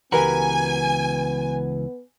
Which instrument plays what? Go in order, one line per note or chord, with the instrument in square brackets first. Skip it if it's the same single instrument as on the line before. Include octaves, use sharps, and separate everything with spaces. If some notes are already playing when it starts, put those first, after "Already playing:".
[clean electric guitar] C#2 E3 F#4 [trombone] B3 [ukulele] G4 A#4 B4 [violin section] G#5